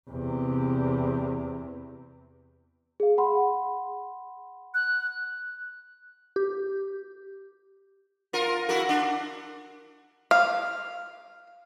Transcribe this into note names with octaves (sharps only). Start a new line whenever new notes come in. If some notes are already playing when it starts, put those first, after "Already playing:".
E2 C3
G#4 F5
F#5 B5 C6
F#6
G4
F4 A#4
E4 F#4 A#4
D4
F5